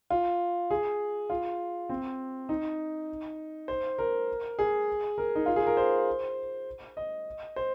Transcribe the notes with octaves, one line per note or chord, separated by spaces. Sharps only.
F4
G#4
F4
C4
D#4
C5
A#4
G#4
A#4
D#4
F4
G#4
A#4
C5
D#5
C5